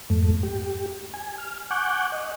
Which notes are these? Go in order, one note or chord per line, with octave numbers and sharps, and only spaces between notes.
F2 G#2 A3
G4
G#5
F6
F#5 G#5 C#6 D6 F#6 G6
D#5